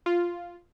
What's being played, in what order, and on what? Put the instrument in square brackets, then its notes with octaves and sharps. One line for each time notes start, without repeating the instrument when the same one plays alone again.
[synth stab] F4